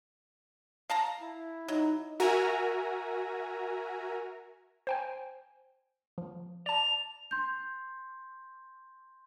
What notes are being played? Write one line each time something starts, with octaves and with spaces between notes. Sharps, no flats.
F5 A5 A#5
E4
F#3 D#4
F#4 A#4 E5 G#5 A#5
C5 G5 G#5
F3
D5 A5 F7
C6 G6